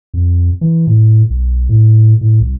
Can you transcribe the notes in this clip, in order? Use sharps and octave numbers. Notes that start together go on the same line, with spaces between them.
F2
E3
A2
B1
A2
A2
C2